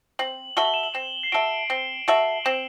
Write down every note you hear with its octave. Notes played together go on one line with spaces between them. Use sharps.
C4 F#7
F#4 A4 E5 G7
F#7
E7
F#7
C4 E7
C7
F#4 A4 E5 D7
C4 G7
F#4 A4 E5 F#7
C4 E7